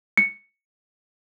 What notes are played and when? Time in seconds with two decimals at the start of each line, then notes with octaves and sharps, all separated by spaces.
0.17 C#7